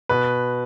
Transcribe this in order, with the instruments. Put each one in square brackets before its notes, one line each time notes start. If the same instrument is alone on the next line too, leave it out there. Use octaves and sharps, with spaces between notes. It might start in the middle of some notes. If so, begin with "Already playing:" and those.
[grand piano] B2 B4